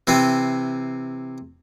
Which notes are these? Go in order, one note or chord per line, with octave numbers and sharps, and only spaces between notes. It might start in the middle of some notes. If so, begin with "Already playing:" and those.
C3 E3 C4